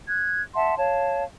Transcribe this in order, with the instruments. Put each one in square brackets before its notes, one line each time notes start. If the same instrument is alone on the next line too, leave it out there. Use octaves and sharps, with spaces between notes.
[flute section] F#6 G#6
E5 F#5 A5 C6
C#5 F5 A5